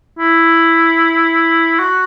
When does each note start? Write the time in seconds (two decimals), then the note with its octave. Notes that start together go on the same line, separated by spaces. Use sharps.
0.19 E4
1.79 F#4